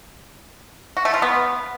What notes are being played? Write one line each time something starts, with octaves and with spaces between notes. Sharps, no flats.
F#4
A3
F4
B3